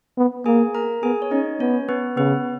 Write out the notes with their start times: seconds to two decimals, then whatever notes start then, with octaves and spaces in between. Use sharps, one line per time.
0.18 B3
0.46 A#3 G#4 G#5
0.75 A#4 A#5
1.03 B3 G#4 G#5
1.22 C#5
1.31 C#4 D#4 D#5
1.60 B3 C#4 C#5
1.89 B3 B4
2.17 C#3 B3 B4